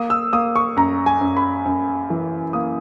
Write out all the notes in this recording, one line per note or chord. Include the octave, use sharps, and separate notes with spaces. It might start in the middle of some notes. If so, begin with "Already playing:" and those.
Already playing: A#3 D#6
E6
A#3 D#6
C#6
F#2 A#5
G#5
F#2
B5
F#2
E3
A#3 D#6